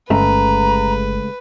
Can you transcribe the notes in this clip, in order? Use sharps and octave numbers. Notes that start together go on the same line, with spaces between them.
G1 C#3 G#3 A3 B4 A#5